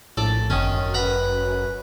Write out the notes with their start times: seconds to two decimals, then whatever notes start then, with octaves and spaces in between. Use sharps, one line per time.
0.17 A#1 A2 A4 D5
0.50 G1 F#2 D#3 C#4
0.94 B4 F#5 A#5 B5